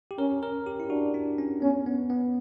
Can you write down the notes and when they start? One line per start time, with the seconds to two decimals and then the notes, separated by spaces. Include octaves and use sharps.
0.11 G4
0.18 C#4 A#4
0.43 A#4
0.67 G4
0.80 E4
0.90 D4 F#4
1.14 D4
1.38 C#4
1.61 B3 C#4
1.86 B3
2.10 B3